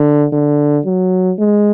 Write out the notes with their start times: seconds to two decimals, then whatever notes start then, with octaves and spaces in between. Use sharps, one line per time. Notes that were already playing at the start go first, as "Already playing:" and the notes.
Already playing: D3
0.33 D3
0.86 F#3
1.39 G#3